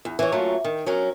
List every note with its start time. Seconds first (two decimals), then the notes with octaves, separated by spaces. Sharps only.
0.05 E2
0.19 E3 C#5
0.32 F#3 A3 A#3 C#4 F4
0.64 D#3
0.86 F#3 C#4 A#4